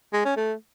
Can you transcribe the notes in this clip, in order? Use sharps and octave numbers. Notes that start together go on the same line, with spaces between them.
G#3
C#4
A3